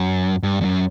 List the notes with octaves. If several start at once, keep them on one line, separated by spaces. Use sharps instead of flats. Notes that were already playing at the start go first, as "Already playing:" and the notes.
Already playing: F#2
G2
E2
F#2